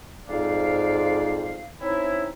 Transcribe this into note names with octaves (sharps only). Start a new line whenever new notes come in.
F2 G#2 G#3 D5 F5
C4 C#4 D#4 E4